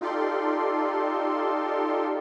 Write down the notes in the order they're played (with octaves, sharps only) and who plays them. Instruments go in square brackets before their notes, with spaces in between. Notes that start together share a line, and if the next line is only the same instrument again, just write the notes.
[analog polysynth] D#4 F4 G4 A4 D5 C6